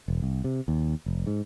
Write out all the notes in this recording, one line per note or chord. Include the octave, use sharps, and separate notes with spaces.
E1
C2
C3
D#2
F1
G#2